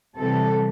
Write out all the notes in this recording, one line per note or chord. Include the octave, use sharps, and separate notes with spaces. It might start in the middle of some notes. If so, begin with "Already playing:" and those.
C3 E3 G3 A4